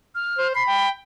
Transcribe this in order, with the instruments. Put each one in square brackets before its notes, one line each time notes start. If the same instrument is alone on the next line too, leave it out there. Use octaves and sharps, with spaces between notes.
[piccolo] F6
[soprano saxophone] C5
[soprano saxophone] B5 [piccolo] C7
[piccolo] G5